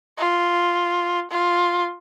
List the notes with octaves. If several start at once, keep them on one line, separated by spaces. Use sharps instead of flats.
F4
F4